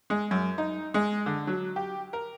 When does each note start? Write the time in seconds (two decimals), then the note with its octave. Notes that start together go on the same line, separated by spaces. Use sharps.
0.10 G#3
0.31 F#2
0.58 D#4
0.94 G#3
1.26 D3
1.47 F#3
1.76 G4
2.13 A#4